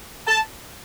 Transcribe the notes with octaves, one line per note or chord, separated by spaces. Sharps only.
A5